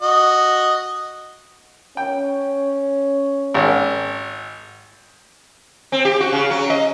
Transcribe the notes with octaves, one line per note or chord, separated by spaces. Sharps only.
F#4 D#5
C#4 G5
G#1
C4
G4
F#4
C#3
F#3
D#5